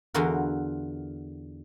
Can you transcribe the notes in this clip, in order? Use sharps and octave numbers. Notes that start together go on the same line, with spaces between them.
E2 D3 F4 F#4 A#4